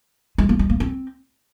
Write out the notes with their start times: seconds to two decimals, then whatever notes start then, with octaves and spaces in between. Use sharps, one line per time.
0.38 G#3
0.49 A#3
0.59 G#3
0.70 A#3
0.80 C4